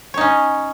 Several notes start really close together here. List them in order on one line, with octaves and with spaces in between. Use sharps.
C#5 D#4 C#4